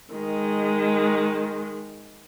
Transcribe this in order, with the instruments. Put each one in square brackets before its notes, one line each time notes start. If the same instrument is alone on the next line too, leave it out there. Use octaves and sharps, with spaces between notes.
[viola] D#3 G#3